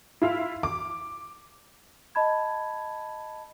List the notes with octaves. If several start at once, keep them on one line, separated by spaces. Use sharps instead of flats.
E4 F4 E5 F5
D6
D#5 A5 B5 G#6